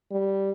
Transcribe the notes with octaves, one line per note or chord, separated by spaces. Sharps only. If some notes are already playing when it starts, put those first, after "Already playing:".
G3